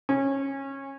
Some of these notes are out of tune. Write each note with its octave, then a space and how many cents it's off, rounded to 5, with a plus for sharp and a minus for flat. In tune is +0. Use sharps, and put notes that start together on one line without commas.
C#4 -20